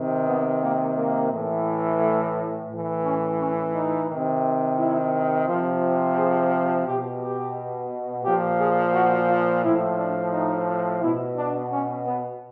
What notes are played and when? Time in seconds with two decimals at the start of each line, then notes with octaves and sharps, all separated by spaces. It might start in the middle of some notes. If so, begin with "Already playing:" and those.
Already playing: C3 D#3
0.28 B3
0.63 A#3
0.97 A#3
1.31 A2 E3
2.00 A3
2.70 A2 E3
3.05 C#4
3.40 C#4
3.74 D#4
4.09 C3 D#3
4.78 E4
5.47 C3 F3 F4
6.17 G#4
6.86 B2 G4
7.20 G4
8.24 A#2 F3 G4
8.60 G#4
8.93 F#4
9.29 F4
9.63 A2 F3 E4
9.98 D4
10.33 D#4
11.02 B2 E4
11.37 D4
11.72 C#4
12.06 B3